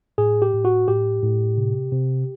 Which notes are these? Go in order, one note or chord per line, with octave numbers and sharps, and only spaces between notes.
A2 G#4
G4
A2
F#4
A2 G4
A2
C3
C3